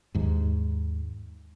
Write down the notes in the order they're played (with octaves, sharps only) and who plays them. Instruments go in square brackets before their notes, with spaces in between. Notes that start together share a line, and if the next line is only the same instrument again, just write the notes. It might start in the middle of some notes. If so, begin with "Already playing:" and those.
[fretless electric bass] D#2 G#2